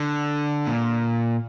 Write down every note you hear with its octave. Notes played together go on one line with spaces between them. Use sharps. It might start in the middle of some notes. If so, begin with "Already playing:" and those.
Already playing: D3
A#2